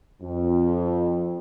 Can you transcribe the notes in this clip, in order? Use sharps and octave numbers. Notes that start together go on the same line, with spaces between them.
F2